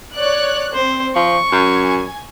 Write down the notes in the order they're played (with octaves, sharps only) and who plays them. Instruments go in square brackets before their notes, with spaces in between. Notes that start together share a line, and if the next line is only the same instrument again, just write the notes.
[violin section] C#5 F#6 [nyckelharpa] D5
[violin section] C4 [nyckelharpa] C5
[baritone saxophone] F3 [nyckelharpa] C#6
[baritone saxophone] F#2 [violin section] G#5